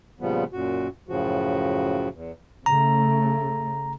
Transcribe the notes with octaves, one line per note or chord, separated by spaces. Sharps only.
A#2 C#3 F3 G3 B3
F#2 A#2 F#4
F#2 A2 C#3 F3 F#4
E2
C#3 A3 A#5